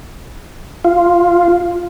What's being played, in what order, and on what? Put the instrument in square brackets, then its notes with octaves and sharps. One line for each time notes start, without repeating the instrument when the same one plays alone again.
[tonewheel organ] F4